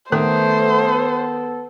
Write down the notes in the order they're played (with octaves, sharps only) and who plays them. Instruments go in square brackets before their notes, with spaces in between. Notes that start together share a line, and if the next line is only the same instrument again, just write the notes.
[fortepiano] D#3 [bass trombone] A3 [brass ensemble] B3 A4 [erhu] C5